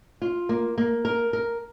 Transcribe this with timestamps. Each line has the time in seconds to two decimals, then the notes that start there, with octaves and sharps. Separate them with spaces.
0.22 F4
0.49 A#3
0.78 A#3
1.05 A#4
1.33 A#4